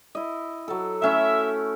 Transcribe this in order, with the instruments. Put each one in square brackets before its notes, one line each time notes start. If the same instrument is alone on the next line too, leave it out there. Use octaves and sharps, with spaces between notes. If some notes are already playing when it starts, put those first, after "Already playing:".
[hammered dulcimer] E4 D#5
F#3 A4
[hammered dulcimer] A3 C#4 E4 [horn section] E5